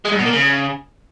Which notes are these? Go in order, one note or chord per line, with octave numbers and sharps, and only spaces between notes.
G#3
G2
B2
A#3
C#3